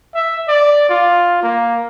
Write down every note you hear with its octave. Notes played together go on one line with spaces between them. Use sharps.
E5
D5
F4
A#3